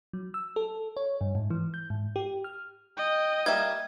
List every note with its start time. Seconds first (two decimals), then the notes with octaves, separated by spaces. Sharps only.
0.13 F#3
0.34 E6
0.56 A4
0.97 C#5
1.21 G2
1.35 G#2
1.50 E3
1.74 G6
1.90 G#2
2.16 G4
2.44 F6
2.97 D#5 G5
3.46 G3 A#3 E5 G#6